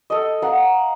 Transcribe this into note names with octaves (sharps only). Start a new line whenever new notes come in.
A4 D#5
F5 F#5 A#5